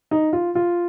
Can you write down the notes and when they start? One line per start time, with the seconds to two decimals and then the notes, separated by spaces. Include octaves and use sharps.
0.11 D#4
0.33 F4
0.55 F4